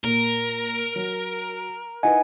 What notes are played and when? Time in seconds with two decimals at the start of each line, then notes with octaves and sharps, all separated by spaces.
0.04 A#2 A#3 A#4
0.96 F#3
2.03 D#4 E4 B4 D#5 F#5 G#5